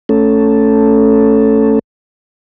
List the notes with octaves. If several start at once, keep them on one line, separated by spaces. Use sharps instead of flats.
A3 C#4 A4